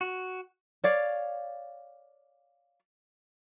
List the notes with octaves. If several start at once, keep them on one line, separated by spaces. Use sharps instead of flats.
F#4
C#5 D5 F5